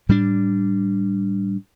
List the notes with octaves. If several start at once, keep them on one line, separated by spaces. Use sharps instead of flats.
A2 G3 D4